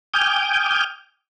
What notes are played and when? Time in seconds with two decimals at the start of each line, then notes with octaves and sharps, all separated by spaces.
0.14 G5 G#5 D6 D#6 F6 G6